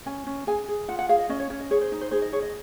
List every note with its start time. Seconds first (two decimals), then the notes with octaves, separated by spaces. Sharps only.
0.06 C#4 G#5
0.27 C#4
0.47 G#4 G#5
0.68 G#4
0.88 F4 F#5
0.99 F#5
1.09 G#4 F5
1.19 D#5
1.29 C#4 D#5
1.40 C#5
1.50 C#4 C#5
1.60 D#5
1.71 G#4 C#5
1.81 C5
1.92 D#4
2.01 C5
2.11 G#4 C5
2.22 D#5
2.32 G#4 C#5
2.42 D#5